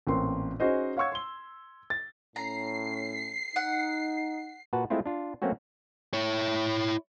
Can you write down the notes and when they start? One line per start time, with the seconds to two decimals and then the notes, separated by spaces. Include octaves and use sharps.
0.07 A1 A#2 C4 A#4 C6
0.60 C#4 D#4 F#4 G#4 C5 D#5
0.97 C#5 F5 F#5 C#6 E6 G#6
1.12 C6 G7
1.90 A6
2.36 A2 C#4 A#5 C7
3.56 D#4 F#5
4.73 A#2 F#4 B4 F#5 A5
4.90 G#3 A3 C4 E4 F4
5.06 D4 F4
5.42 F#3 A3 A#3 C4 C#4 F#4
6.13 E4 C#5